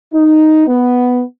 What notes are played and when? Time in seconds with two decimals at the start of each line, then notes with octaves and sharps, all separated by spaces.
0.14 D#4
0.67 B3